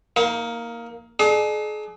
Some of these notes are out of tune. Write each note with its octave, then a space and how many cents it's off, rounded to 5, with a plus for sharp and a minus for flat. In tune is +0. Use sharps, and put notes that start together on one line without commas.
A#3 +0 D#4 +40
D4 +45 G#4 +40